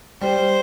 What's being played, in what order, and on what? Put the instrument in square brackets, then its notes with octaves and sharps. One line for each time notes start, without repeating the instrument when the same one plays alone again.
[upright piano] G3 [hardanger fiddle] C5